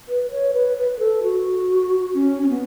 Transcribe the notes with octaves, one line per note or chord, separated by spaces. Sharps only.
B4
C#5
B4
B4
A4
F#4
C#4
C#4
B3